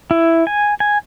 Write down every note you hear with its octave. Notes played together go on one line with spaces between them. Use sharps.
E4
G#5
G#5